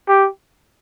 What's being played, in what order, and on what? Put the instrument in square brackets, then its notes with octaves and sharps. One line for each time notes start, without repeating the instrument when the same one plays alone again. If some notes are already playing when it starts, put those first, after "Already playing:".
[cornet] G4